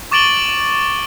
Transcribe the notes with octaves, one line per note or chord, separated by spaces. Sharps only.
C#6 D6 A6 D7 F#7 G7